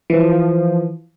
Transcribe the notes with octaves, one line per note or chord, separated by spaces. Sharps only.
E3 F3